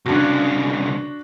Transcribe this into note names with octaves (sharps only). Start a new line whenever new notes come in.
C2 C#3 D4 F#4